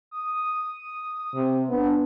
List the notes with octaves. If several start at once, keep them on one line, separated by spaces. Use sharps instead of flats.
D#6
C3
B3 D4